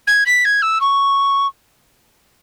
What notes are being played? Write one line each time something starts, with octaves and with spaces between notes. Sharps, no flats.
G#6
B6
G#6
E6
C#6